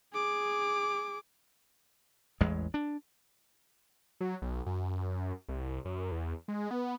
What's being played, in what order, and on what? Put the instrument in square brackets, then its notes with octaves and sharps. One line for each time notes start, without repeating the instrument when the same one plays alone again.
[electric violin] G#4 D6
[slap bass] A1 E2 G#3
D4
[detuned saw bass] F#3
B1
F#2
C2
F#2
E2
G#3
B3